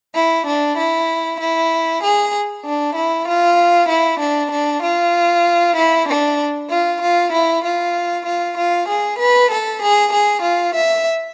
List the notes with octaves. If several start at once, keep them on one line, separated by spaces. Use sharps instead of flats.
E4
D4
E4
E4
G#4
D4
E4
F4
E4
D4
D4
F4
E4
D4
F4
F4
E4
F4
F4
F4
G#4
B4
A4
G#4
G#4
F4
E5